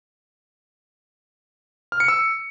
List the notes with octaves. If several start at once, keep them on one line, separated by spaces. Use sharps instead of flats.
F6
C#7
E6